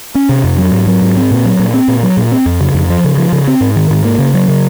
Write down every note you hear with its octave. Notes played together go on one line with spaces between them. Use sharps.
C#4
C3
F2
F#3
G#2
F#3
G#2
C4
A#2
F#3
A#2
C4
A#2
F#3
A#2
C4
F2
C#3
F2
F3
C#3
F3
C#3
C4
G#2
D#3
G#2
A#3
C#3
F#3
C#3